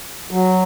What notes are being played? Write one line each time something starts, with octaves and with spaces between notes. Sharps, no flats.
F#3